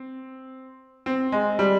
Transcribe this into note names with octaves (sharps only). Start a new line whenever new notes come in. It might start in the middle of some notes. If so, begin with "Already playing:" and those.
Already playing: C4
C4
G#3
G3